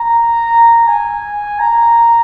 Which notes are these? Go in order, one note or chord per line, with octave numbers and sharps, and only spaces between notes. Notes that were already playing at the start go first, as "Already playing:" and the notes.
Already playing: A#5
G#5
A#5